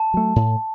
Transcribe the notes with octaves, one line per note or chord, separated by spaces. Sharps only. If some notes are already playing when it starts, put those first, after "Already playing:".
Already playing: A5
F#3 A3
A2